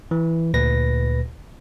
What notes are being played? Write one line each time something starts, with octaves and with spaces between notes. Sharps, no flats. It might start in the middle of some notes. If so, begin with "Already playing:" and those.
E3
D2 A#2 B4 A#6